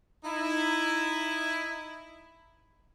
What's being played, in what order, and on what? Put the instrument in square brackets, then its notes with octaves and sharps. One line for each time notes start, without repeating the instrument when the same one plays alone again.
[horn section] D#4 E4